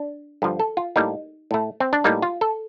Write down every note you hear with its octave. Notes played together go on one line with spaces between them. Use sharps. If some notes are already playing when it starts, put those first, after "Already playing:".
Already playing: D4
G2 D3 F3
A4
F4
A2 G3 A#3 D#4
A2 A3
C4
D4
A2 G3 A#3 D#4
F4
A4